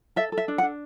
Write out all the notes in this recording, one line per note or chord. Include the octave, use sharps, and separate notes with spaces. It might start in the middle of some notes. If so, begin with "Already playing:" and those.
A4 E5
A4
E5
D4
F#5
D4